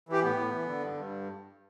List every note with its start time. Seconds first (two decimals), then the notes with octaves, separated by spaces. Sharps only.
0.09 E3 G4
0.23 A2 B3
0.36 A2
0.51 E3
0.66 D3
0.79 G2
0.93 G2